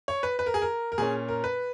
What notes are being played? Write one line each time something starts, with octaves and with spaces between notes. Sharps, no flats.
C#5
B4
B4
A#4
G#4
A#4
A#4
A#2 A#3 C#4 G#4
A#4
B4